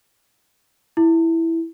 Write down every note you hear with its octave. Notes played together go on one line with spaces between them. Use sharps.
E4